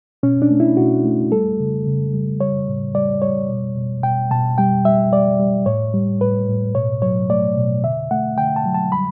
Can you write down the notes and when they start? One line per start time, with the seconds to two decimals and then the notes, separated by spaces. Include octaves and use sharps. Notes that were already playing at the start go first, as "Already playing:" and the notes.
0.23 B2 C#4
0.42 D4
0.50 A3
0.60 E4
0.77 B2 F#4
1.04 A3
1.32 G3 A4
1.60 C#3
1.86 C#3
2.14 G3
2.40 G3 C#5
2.68 A2
2.95 G3 D5
3.22 G3 C#5
3.49 B2
3.77 B2
4.03 B2 G5
4.31 B2 A5
4.58 G3 G5
4.85 G3 E5
5.12 G3 D5
5.39 G3
5.66 A2 C#5
5.94 G3
6.21 A2 B4
6.48 A2
6.75 B2 C#5
7.02 F#3 C#5
7.30 A3 D5
7.57 B2
7.84 D3 E5
8.11 A3 F#5
8.38 D3 G5
8.56 A5
8.66 F#3
8.74 A5
8.92 G3 B5